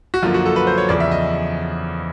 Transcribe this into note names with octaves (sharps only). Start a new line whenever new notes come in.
F#4
F#2 D3 F3 A#3 F4
F#4
A4
B4
C5
C#5
E2 C#3 F3 D5
E5
D#5